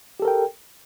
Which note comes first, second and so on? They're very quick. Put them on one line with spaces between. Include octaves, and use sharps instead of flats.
G4 A4 A#4 G5